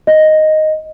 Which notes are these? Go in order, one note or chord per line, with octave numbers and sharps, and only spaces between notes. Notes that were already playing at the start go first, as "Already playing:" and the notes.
D#5